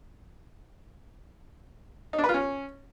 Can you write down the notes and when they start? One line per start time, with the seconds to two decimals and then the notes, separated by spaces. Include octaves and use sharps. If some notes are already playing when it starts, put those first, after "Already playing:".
2.13 D#4
2.18 D4
2.24 B4
2.29 F4
2.34 C#4